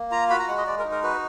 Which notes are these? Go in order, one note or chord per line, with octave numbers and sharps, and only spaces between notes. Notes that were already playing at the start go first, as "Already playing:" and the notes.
Already playing: A#3
F4 A#5
F#4 B5
A#5
G#3 F#5
D#5
G#3 D5
A#4
D#4
A#4
F#4 B4